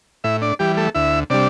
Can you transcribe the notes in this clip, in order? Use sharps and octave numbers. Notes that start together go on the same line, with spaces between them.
A2 E4 E5
D4 D5
E3 G3 G4
A3 A4
D2 E4 E5
C3 G3 D4 D5